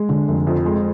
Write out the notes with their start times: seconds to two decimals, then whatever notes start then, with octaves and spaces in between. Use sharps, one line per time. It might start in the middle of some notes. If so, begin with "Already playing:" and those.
Already playing: G#3
0.09 D3
0.28 F1
0.47 F2
0.66 G#3